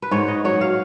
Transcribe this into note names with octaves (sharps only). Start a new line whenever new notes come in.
B4
G#2 C#5
D#5
F#3 C#5
F5